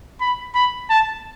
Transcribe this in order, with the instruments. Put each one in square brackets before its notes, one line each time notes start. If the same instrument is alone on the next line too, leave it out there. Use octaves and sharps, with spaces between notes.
[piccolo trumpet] B5
B5
A5